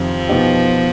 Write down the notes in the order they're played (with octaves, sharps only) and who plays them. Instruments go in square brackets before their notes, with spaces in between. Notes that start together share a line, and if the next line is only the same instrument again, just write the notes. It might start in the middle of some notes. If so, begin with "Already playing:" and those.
Already playing: [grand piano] F2 C3 D#3 [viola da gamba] F3
[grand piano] B2 B3 D#4 G4